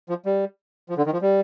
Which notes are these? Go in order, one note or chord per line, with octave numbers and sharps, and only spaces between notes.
F3
G3
F3
D3
D#3
F3
G3